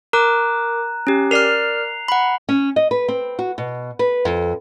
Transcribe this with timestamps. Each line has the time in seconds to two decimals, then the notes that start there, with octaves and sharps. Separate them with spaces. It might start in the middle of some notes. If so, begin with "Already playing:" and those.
0.13 A#4 A#5 D6 F#6
1.07 C#4 G4
1.31 A#4 D5 F6 C7 F7
2.08 F#5 B5
2.49 C#4
2.76 D#5
2.91 B4
3.08 C4
3.39 F#4
3.58 B2
3.99 B4
4.25 F2